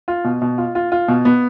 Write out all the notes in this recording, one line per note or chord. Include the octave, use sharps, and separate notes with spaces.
F4
B2
B2
F4
F4
F4
B2
B3